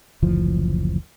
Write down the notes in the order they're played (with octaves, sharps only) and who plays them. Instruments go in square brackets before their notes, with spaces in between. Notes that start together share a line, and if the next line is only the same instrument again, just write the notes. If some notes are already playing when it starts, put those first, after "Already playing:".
[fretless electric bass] F#1 D2 E3 F3